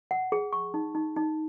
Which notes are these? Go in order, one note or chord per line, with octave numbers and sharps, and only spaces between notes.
F#5
G#4
C#6
D#4
D#4
D#4